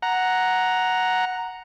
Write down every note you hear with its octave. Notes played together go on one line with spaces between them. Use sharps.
F#5 A#5